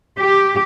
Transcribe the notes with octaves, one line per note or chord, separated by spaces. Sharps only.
G4